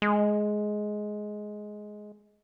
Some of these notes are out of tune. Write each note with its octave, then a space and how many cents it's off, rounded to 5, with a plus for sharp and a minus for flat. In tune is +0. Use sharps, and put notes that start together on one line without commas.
G#3 +10